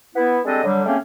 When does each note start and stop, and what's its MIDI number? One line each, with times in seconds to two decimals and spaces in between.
0.15 0.39 59
0.15 0.39 64
0.45 0.63 55
0.45 0.63 56
0.45 0.63 60
0.45 0.63 62
0.45 0.63 69
0.45 0.63 75
0.64 0.82 50
0.64 0.82 54
0.64 0.82 55
0.86 0.97 49
0.86 0.97 57
0.86 0.97 58
0.86 0.97 60
0.86 0.97 61